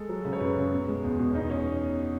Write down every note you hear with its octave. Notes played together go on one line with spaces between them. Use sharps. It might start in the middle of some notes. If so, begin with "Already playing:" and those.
Already playing: G#3 A4
F#3
C#3
C#5
F#2 B4
C#3
B2
G#3
E2
B2
C#4
E2 D#4
C#4